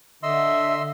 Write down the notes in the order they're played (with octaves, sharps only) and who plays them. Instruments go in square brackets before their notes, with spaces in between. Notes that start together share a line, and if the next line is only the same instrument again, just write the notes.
[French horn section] D3 [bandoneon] D#5 C6 E6 [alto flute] E5